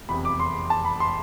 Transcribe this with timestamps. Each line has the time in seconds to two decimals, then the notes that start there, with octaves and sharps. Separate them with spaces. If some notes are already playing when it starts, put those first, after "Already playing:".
0.09 F1 E2 C3 B5
0.25 D6
0.40 C6
0.70 A5
0.85 B5
1.00 C6